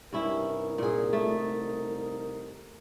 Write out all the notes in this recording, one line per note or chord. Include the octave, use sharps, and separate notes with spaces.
C2 G2 C#4 D#4 E4 A#4
A#2 G#4
A3